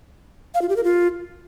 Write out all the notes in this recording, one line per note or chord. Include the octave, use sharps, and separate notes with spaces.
F5
F4
G4
A#4
F4